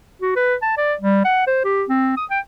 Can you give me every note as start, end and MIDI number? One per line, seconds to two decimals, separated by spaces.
0.22 0.35 66
0.36 0.55 71
0.63 0.77 81
0.77 0.94 74
1.01 1.24 55
1.25 1.46 78
1.47 1.63 72
1.65 1.84 67
1.89 2.14 60
2.17 2.25 87
2.30 2.40 79